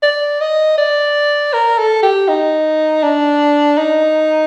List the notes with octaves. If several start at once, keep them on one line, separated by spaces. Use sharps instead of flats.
D5
D#5
D5
A#4
A4
G4
D#4
D4
D#4